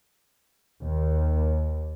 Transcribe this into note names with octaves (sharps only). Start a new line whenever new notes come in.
D#2